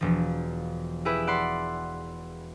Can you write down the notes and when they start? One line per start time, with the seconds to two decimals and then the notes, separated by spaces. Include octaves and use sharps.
0.01 E1 F3
1.05 E4 G4 G#4 B4 E5
1.27 D5 F#5 B5 C6